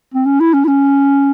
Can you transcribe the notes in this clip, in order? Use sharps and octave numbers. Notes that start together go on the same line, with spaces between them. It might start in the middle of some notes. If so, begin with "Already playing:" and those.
C4
C#4
E4
C#4
E4
C#4